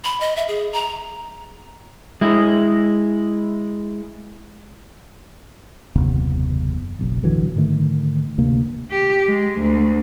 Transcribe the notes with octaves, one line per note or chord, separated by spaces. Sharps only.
B5
D#5
E5
G#4
A#5
G#3 E4
F#1 D#2 C3 B3
F#1 B1
A1 D3 E3 F#3
G#2 D3 D#3 A3
D2 C3 A#3
G4
G#3
D2